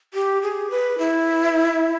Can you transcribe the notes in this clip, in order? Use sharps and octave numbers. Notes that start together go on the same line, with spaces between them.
G4
G#4
B4
E4